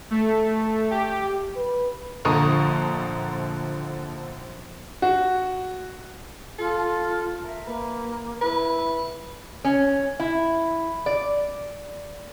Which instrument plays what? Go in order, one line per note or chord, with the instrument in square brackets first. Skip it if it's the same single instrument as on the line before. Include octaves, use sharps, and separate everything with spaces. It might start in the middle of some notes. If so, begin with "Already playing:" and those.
[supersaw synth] A3
G4
[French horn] B4
[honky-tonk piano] A#1 D3 F3 A#5 C#6 D#6
[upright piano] F#4
[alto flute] F4 [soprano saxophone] A4
[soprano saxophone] A#4 [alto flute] E5
[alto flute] A#3 [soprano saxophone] B4
[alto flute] E4 [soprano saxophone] B4
[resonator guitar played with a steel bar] C#4
E4
D5